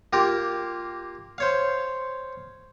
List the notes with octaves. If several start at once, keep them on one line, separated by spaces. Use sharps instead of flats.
A#3 F4 G4 A#4
C5 C#5 F5